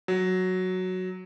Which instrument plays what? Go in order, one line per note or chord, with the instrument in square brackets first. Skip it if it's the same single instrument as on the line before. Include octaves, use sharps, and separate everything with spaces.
[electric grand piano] F#3